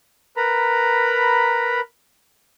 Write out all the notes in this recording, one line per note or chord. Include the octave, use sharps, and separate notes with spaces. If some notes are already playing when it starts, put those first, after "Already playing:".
A#4 B4 A#5 B5